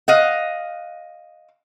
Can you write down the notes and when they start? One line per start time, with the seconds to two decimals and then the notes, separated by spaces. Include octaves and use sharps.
0.08 D#5 F5 F#5